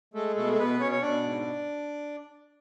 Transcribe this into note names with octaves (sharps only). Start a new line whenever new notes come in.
G#3 A3 A4
B2 A3 A4
A4
B2 B3 B4
B2 C#4 C#5
C#5
B2 D4 D5
G#2